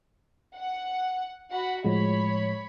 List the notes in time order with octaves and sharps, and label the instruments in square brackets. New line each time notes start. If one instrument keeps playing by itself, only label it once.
[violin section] F#5
F#4 F#5 B5
[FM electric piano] A2 F3 G#3 [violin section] C#5 B5